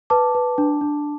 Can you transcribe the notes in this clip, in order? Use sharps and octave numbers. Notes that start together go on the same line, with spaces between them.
B4 A5 D6
B4
D4
D4